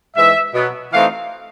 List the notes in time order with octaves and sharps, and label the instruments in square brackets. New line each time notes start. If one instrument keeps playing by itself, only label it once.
[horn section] G#2 E3 G#3 E5
B2 F#3 B3
E3 A3 C4 D#4 F5